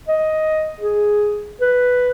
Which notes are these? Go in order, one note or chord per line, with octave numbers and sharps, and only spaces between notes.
D#5
G#4
B4